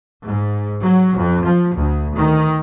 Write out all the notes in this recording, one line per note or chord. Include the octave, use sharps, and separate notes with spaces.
G#2
F#3
F2
F3
D2
D#3